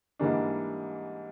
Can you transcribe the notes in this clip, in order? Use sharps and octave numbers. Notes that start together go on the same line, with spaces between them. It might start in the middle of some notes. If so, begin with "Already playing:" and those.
G#2 E3 G3 A#3 D4